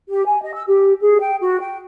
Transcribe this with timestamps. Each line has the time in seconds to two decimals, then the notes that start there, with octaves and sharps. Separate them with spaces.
0.09 G4
0.25 G#5
0.42 D#5
0.54 E6
0.68 G4
1.01 G#4
1.19 G5
1.40 F#4
1.61 G5